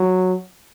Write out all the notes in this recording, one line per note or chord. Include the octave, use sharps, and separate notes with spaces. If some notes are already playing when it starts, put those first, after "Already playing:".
Already playing: F#3